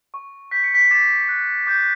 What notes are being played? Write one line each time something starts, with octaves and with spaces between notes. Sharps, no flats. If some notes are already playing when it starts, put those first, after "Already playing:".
C#6
G6 B6
C#7
B6
D6 A6
F#6
D6 G6